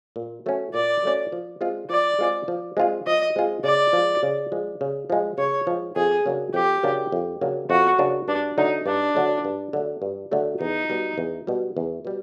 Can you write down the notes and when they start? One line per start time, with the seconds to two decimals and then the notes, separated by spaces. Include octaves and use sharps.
0.16 A#2
0.46 F#3 A3 C#4
0.74 A#2 D5
1.03 F#3 A3 C#4
1.32 F3
1.61 G#3 C4 F4 G#4
1.90 F3 D5
2.19 G#3 C4 F4 G#4
2.48 F3
2.77 G#3 C4 F4 G#4
3.06 F3 D#5
3.36 G#3 C4 F4 G#4
3.64 C#3 D5
3.93 F3 G#3
4.23 C#3
4.52 F3 G#3
4.81 C#3
5.10 F3 G#3
5.38 C#3 C#5
5.67 F3 G#3
5.96 F2 G#4
6.26 C#3 F#3 A#3 D4
6.54 F2 G4
6.83 C#3 F#3 A#3 D4
7.12 F2
7.41 C#3 F#3 A#3 D4
7.70 F2 F#4
7.99 C#3 F#3 A#3 D4
8.28 G2 D4
8.58 D3 F#3 A3 D#4
8.86 G2 D4
9.15 D3 F#3 A3
9.45 G2
9.73 D3 F#3 A3
10.02 G2
10.31 D3 F#3 A3
10.60 E2 D#4
10.90 B2 G3
11.18 E2
11.47 B2 G3
11.77 E2
12.05 B2 G3